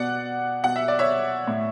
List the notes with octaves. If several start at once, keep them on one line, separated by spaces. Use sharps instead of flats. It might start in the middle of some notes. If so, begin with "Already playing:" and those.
Already playing: B2 D5 F#5
B2 F#5
E5
D5
C#5 E5
A2